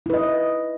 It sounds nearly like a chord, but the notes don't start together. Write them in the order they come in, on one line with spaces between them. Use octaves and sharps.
E4 B4 D#5